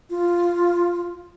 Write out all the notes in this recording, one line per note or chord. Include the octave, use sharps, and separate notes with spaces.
F4